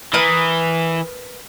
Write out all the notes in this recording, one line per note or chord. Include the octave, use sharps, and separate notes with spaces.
E3 A#4 B4 D#6